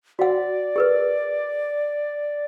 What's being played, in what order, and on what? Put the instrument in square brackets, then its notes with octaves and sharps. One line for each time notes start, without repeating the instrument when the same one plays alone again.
[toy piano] F#4 F#5 [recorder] D5
[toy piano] G#4 A#4 B4